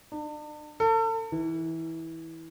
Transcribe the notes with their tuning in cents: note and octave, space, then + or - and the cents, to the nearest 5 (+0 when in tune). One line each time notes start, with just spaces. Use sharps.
D4 +40
A4 +40
E3 -20